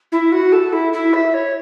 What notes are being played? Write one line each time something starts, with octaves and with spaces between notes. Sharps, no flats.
E4
F#4
A4
E4
E4
E5
C#5